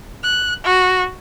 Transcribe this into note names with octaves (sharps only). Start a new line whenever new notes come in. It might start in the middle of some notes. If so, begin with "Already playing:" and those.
F#6
F#4